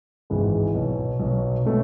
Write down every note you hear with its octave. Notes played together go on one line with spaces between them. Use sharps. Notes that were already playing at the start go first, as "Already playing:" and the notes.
G#1 G#2 E3 G#3
B1 B2 F#3
B1 B2 F#3
B2 A3 C#4